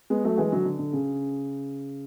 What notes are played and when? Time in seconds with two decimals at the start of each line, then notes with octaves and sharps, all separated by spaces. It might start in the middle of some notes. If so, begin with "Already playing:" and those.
0.10 G#3 B3
0.24 F#3 A3
0.38 E3 G#3
0.52 D3 F#3
0.65 D3
0.79 D3
0.93 C#3